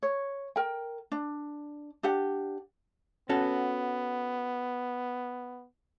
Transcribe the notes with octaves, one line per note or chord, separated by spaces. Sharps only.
C#5
A#4 G5
D4
D4 G4 F#5
B3 C#4 F#4 A4